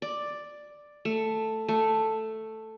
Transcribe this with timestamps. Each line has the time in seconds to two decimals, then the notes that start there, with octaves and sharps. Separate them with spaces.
0.02 D5
1.05 A3
1.68 A3